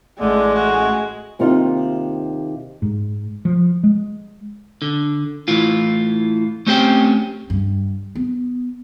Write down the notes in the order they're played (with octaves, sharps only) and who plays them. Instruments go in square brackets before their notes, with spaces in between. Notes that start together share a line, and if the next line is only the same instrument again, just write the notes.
[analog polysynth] A1 A3 [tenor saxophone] D3 [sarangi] G#3
[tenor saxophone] F#4
[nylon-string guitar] D#2 C3 A#3 D#4 F4 D#5
[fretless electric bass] G#2
F3
G#3
[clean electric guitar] D3
A2 E3 F4
A3 C4 C#4 G4 C5 G5
[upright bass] G2
B3